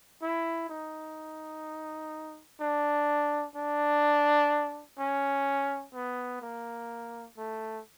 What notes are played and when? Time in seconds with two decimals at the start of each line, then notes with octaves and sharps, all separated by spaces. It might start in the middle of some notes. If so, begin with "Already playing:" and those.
0.22 E4
0.69 D#4
2.61 D4
3.56 D4
4.98 C#4
5.94 B3
6.42 A#3
7.37 A3